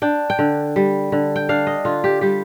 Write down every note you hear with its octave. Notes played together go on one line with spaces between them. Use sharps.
D4 G5
G5
D3
G3
D3
G5
D4 F5
D#5
D3 F4
G4
G3 G4